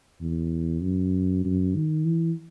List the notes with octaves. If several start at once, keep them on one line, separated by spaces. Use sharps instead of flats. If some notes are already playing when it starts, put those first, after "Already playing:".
E2
F#2
F#2
D#3
E3